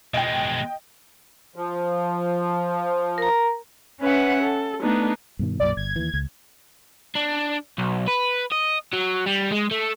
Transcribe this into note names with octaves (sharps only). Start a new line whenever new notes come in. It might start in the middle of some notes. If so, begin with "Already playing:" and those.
B2 G#3 D#5 G5
F3
A#4 A#5
C#4 B4 E5 F#5
A4
A3 B3 D4 D#4
G2 B2 D#3
B1 F#2 A#2 D5
G1 G#6
D#2 E3
C#2
D4
B1
B4
D#5
F#3
G3
G#3
A3